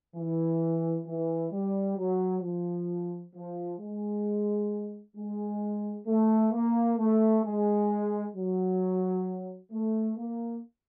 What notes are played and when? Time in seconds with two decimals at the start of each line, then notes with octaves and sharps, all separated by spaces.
0.16 E3
1.06 E3
1.52 G3
1.98 F#3
2.42 F3
3.34 F3
3.80 G#3
5.16 G#3
6.07 A3
6.53 A#3
6.98 A3
7.44 G#3
8.35 F#3
9.71 A3
10.17 A#3